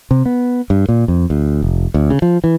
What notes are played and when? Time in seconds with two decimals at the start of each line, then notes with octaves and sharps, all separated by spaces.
0.11 C3
0.26 B3
0.70 G2
0.89 A#2
1.08 F2
1.30 D2
1.62 F1
1.94 D2
2.10 C#3
2.22 F3
2.44 E3